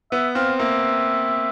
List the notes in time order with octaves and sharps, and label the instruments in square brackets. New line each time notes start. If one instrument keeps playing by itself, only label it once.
[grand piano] B3 [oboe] E5
[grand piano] C4 [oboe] F5
[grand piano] A#3 [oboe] E5